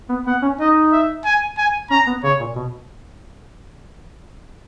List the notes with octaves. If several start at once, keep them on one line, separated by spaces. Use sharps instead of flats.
B3
B3 F#5
C#4
D#4 D#5
E5
G#5
G#5
C#4 A#5
B3
C#3 C#5
A#2
B2